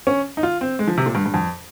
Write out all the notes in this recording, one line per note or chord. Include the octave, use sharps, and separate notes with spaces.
C#4
D#4
F4
C4
G#3
F3
C3
A#2
G2
G2
F2